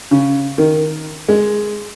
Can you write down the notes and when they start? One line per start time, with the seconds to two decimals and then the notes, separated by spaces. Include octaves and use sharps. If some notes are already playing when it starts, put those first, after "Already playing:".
0.11 C#3
0.58 D#3
1.28 G#3